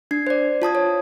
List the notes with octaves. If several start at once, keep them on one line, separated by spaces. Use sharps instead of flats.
D4 G#6 C7
C5 D5
F4 A5 D#6 G#6
C#5